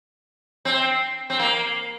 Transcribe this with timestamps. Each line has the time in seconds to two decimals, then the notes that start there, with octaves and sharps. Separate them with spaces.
0.65 C4
1.30 C4
1.39 A#3